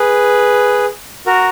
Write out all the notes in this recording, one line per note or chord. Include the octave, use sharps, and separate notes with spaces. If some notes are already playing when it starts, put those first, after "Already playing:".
Already playing: G#4 B4
F#4 A#4